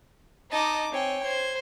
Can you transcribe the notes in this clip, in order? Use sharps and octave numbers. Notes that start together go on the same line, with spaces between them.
D#4 D#5 A5 D6
C4 C#5 G5 G#5
C5 G#6